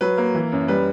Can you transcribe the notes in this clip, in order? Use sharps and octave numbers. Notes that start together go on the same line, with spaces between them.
F#3 B4
A#3
E3
F#2
G3 B4